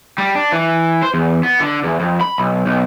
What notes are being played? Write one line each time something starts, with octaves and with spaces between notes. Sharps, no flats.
G3
D4
E3
C5
E2
B3
D3
E2
F2
B5
B1
B1